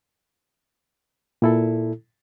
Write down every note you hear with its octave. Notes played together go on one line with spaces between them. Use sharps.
A#2 E4 A4